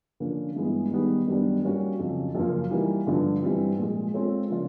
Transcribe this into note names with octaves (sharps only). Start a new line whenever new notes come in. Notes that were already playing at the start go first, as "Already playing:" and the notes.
D3 F3 A#3 C#4
G2 E3 G#3 B3
D#3 G3 B3 D#4 G#4
F#2 D#3 G3 B3 D4
G3 A#3 C#4 F#4
F2 C#3 F#3
F#2 C#3 F3 A#3
E3 G3 A#3 D#4
G2 D3 F3
G2 E3 G3 C4
A#2 F3 G#3
G#3 C4 F4 A4 C#5
C#3 F3 A#3 D4 F4